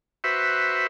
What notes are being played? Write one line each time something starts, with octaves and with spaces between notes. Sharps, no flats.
F#4 B4 C5 E5